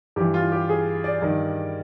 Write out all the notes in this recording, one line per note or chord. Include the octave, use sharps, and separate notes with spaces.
G2 E3 G4
F4
G4
G#4
D5
G2 D#3